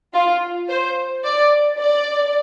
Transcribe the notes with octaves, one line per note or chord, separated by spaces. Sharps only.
F4
C5
D5
D5